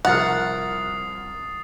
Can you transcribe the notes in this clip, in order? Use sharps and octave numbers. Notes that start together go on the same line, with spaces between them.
C2 F3 A#4 F#5 D#6 A6 C7